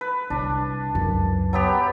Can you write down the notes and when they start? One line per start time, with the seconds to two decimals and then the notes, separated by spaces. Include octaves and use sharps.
0.01 B4
0.30 C2 D4
0.95 C#2 F#2
1.53 F#3 B3 G4